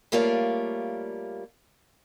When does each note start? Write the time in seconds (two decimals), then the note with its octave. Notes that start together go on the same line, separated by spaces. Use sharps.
0.12 G3 A3 A#3 F4 C#5 D5